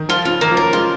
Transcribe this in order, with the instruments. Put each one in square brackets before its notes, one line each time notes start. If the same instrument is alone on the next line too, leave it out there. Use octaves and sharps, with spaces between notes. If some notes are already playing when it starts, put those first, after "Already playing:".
Already playing: [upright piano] D#3
[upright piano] F3 [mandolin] F4
[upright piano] C#3 [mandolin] F4
[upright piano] D#3 [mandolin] A#3
[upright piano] F3
[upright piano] F#3 [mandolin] A#4
[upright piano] G#3 [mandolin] F4